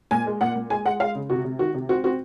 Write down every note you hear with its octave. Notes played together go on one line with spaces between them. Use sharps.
A#2 G#5
G#3
A#2 F#5
A#2
G#3 G#5
G#3 F#5
G#3 F5
C#3
C3 F#4
C3
D#3 F#4
C3
C4 F#4
C4 F#4